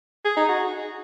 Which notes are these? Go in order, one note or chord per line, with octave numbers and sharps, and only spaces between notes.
G#4
D#4
F#4